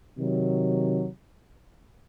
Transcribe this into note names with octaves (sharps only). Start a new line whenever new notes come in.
C3 D#3 F#3